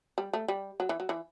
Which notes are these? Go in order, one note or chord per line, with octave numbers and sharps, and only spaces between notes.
G3
A3
G3
F#3
E3
F#3
E3